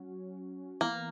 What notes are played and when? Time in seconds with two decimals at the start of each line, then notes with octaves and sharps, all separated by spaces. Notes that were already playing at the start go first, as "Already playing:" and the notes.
Already playing: F#3 C#4 F#4
0.81 E3 A#3 B3 E4